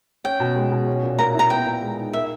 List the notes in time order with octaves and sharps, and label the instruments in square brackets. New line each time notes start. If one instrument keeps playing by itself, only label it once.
[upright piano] C#4 [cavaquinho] G5
[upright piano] B2
G#3
B2
C#4
A#2
[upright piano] A#3 [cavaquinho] A#5
[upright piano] E4 [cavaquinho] A#5
[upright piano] B3 [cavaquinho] G5
[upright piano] A#2
G#3
D#4
[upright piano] A#3 [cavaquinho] E5